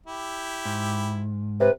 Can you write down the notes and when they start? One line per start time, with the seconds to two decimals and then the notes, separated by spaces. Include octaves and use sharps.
0.06 E4 G4
0.65 G#2
1.60 C3 B4